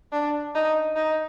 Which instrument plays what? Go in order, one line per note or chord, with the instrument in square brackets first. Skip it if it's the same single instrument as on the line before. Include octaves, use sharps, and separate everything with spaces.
[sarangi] D4
D#4
D#4